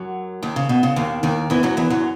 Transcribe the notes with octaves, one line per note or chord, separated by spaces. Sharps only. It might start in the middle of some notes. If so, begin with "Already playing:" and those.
Already playing: F#2 F#3
D#2 D#3
C#3
B2
C#3
D#2 D#3
D#2 D#3
E2 E3
F#2 F#3
E2 E3
F#2 F#3